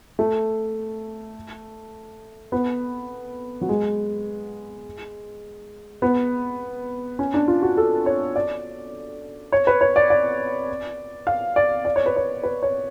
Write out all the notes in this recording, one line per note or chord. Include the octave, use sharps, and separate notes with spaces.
A3
B3
F#3
G#3
B3
C#4
D4
F4
F#4
A4
C#5
D5
C#5
B4
C#5
D5
D5
F5
D5
D5
C#5
B4
C#5
B4
C#5